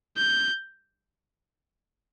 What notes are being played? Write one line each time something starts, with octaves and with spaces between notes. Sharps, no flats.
G6